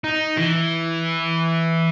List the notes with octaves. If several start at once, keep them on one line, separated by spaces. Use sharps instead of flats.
D#4
E3